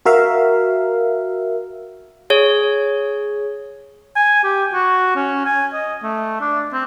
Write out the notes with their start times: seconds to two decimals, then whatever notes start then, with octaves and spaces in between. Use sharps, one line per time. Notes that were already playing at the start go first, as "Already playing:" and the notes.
0.06 F#4 A#4 E5 F5
2.30 G#4 C#5
4.16 G#5
4.44 G4
4.73 F#4
5.16 C#4
5.46 G#5
5.73 D#5
6.03 A3
6.41 D4
6.73 C4